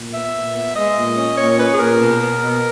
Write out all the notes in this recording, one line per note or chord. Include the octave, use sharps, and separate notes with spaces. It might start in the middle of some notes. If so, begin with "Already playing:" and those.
Already playing: A#2
B3 E5
A#2
B3
G#3 D#5
A#2
C#4
A#2 C#5
C#4 B4
G#4
A#2 A#4
B2
B3
B2